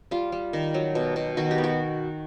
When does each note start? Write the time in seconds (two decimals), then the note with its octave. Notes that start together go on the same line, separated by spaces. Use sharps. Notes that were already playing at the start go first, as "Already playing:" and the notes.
0.11 G3 F4
0.32 G3
0.53 D#3
0.74 F#3
0.95 B2
1.16 B2
1.37 D#3 F#4
1.51 G4
1.58 B3
1.64 F#4